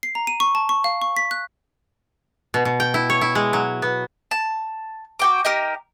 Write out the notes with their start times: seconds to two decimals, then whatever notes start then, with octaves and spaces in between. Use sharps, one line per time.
0.03 C7
0.15 A#5
0.27 D#7
0.40 C#6
0.55 A5
0.69 C#6
0.84 F5
1.01 C#6
1.16 B6
1.31 F#6
2.54 B2
2.65 B2
2.80 G5
2.94 E4
3.10 C#5
3.21 E4
3.35 G#3
3.53 F#3
3.82 B3
4.31 A5
5.19 F#4 G5 D6
5.45 D#4 G4 A#4